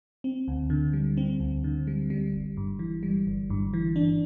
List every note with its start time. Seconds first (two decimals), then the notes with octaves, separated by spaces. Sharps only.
0.24 C4
0.48 D2
0.70 D3
0.93 G3
1.17 C4
1.40 D2
1.64 D3
1.87 G3
2.10 G3
2.33 G1
2.57 G2
2.79 E3
3.03 G3
3.27 G1
3.50 G2
3.74 E3
3.96 D4